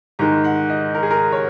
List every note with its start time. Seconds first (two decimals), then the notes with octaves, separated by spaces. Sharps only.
0.19 G#2 D#3 G#3 A#5
0.44 F#5
0.70 D#5
0.94 A#4
1.03 G#4
1.11 A#4
1.32 C#5